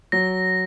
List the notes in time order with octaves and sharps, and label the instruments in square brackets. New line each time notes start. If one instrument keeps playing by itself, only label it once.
[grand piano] F#3 [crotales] A#6